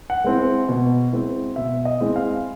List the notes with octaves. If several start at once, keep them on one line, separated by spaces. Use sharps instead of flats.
F#5
G#3 C4 E4
B2
G#3 C4 E4
B2 E5
D#5
G#3 C4 E4
F5